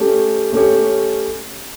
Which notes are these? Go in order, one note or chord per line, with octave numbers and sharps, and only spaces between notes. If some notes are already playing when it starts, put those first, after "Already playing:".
Already playing: A3 C#4 G4 C#5
A3 C#4 G4 C#5